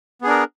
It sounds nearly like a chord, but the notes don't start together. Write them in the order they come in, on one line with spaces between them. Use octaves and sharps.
B3 G#4 D4 A#4